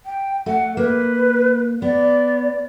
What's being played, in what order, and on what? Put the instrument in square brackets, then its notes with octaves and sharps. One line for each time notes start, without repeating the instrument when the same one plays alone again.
[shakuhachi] G5
[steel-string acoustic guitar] A3 [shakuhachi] F#5
[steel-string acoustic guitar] A#3 [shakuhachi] B4
[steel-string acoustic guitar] B3 [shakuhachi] D5